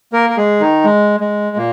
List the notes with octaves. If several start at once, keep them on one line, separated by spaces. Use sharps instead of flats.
A#3 A#4
A#4
G#3 G#4
D#3 D#4
G#3
G#3
A#2 A#3